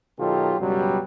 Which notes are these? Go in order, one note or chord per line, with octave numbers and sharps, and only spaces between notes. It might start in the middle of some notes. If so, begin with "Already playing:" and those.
B2 D#3 F#3 F4 G4 A4
C#2 F#2 B2 F#3 G3